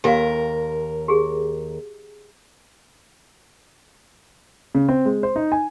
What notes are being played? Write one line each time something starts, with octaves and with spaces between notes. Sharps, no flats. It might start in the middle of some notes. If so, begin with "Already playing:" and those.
D#2 G4 A#4 F5
G4 G#4
C#3
C4
G#3
C5
D#4
G#5